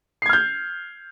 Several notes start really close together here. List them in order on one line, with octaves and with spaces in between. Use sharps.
C7 G#6 F6 G6